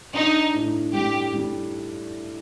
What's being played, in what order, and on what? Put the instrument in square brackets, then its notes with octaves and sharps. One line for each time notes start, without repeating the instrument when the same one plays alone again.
[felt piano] D4 [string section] D#4
[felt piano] A2
[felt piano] G3 [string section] G4
[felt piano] G3